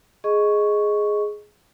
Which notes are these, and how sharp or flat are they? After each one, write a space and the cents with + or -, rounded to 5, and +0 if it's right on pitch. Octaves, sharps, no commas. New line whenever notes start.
G#4 +5 D#5 +0 C#6 +0